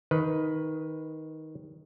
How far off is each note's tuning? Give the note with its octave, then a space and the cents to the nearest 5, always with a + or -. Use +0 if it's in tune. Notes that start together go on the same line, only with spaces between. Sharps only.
D#3 +15 B4 +0